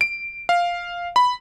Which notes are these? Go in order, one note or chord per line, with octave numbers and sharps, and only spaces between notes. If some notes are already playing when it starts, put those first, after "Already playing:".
D7
F5
B5